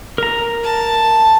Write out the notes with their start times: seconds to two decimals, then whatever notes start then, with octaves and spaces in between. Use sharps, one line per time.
0.18 A#4 A#5
0.64 A5